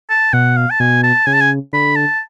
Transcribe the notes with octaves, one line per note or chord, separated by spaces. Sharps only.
A5
B2 F#5
F5
A5
B2 G#5
A5
C#3 G#5
A5
G#5
D3 B5
A5